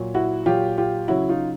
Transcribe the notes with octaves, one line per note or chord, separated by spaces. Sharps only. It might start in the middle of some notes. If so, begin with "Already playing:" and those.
Already playing: A#2 F#3
E4 F#4
A#2 F#3 F4 G4
F4 G4
C#3 F#3 E4 F#4
D#4 F4